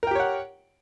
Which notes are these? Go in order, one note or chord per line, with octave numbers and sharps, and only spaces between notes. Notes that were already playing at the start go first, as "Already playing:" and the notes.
G4 A#4 C#5 F#5 G5